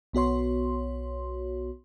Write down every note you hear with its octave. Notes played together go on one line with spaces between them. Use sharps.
B1 B3 F#4 C#5 C6